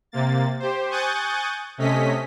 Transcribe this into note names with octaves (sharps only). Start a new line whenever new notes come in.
C3 A#3 A6
G4 C5
G#5 C#6 D#6 F#6 G6 A6
C3 A3 C#4 D#5 B6